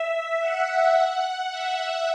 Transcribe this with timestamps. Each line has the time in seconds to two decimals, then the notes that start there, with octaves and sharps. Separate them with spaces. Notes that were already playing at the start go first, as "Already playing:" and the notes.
Already playing: E5
0.40 F#5
1.51 E5